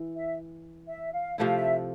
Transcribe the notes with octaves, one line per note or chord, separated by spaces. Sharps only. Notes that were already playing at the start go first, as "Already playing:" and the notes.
Already playing: E3
E5
E5
F5
C3 F3 A3 E4 F5
E5